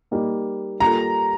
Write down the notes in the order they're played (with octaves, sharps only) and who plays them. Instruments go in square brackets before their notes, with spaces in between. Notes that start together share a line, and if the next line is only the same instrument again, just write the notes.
[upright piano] G3 A#3 D#4
[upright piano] G3 A#3 F4 A4 [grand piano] A#5